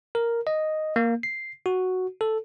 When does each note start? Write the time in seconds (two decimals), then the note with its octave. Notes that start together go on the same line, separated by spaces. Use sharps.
0.15 A#4
0.47 D#5
0.96 A#3
1.23 C7
1.66 F#4
2.21 A4